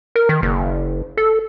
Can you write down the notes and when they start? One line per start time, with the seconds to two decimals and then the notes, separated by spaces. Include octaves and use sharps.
0.16 A#4
0.29 D#3
0.42 F#1
1.17 A4